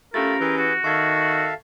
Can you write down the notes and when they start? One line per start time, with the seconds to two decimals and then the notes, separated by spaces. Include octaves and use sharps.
0.14 A3 C#4 F4 G4 A#4 B5 A6
0.40 E3 G#4 B4 G6
0.57 F#4
0.84 D#3 A4 E5 F5 C#6 G#6